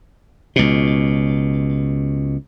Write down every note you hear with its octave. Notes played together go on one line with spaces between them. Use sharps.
C#2 B2